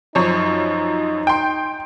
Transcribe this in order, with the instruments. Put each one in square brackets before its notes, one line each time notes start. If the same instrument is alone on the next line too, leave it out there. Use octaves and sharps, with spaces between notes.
[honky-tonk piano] F#2 F3 C#5 [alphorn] D#4
[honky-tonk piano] G5 C6